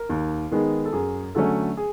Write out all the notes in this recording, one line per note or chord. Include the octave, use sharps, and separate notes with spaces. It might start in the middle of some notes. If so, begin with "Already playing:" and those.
Already playing: A#4
D#2
D#3 G#3 B3
A4
F#2 G#4
D3 F#3 A3 C#4 A4
G#4